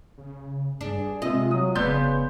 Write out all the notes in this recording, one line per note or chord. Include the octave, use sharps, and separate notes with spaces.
C#3
G2 D4 G#4
C3 G#3 F4 D#5
F#3 D#6
F1 C#3 B3 D5 C6 G6